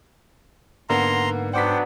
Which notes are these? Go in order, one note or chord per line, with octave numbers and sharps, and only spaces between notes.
G#2 D3 A#3 B3 A#5 C6
F#3 B3 D4 C5 F#5 G5 D6 B6